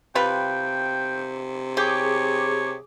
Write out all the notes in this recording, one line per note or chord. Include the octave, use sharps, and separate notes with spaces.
C3 G3 F4 B4 G5
G4 G#4 C#5 D6